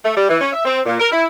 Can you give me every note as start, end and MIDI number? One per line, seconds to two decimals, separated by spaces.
0.03 0.16 57
0.16 0.28 55
0.29 0.36 52
0.40 0.49 61
0.52 0.63 76
0.64 0.79 60
0.86 0.95 46
0.99 1.10 70
1.11 1.25 64